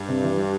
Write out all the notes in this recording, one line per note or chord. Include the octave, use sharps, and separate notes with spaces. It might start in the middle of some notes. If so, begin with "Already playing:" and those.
Already playing: G2
C3
E3
G3